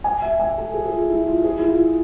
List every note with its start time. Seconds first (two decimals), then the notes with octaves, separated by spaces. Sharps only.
0.04 G#5
0.22 E5
0.39 G#5
0.57 A4
0.74 G#4
0.85 G#4
0.92 F4
1.10 E4
1.27 F4
1.44 G#4
1.59 E4
1.68 F4